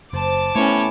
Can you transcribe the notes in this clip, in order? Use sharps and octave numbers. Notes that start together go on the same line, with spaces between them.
F#1 C5 A5 D6
A2 E3 A3 B3 C#4 C#5